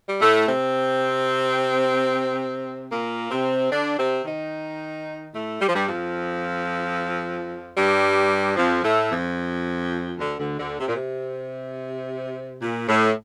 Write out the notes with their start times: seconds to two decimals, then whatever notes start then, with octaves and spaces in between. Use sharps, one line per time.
0.09 G3
0.20 A2 A3
0.47 C3 C4
2.90 A#2 A#3
3.30 C3 C4
3.71 D3 D4
3.98 C3 C4
4.25 D#3 D#4
5.33 A2 A3
5.60 G3
5.68 F3
5.75 G2 G3
5.87 F2 F3
7.76 G2 G3
8.56 F2 F3
8.83 A2 A3
9.10 F2 F3
10.18 D2 D3
10.38 D2 D3
10.59 D2 D3
10.79 C3
10.87 A#2
10.95 C3
12.61 A#2
12.88 A2